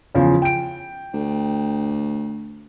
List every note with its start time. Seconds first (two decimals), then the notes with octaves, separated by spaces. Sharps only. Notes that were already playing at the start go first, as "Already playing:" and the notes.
0.15 E2 C#3 F3
0.42 G5 D7
1.13 D2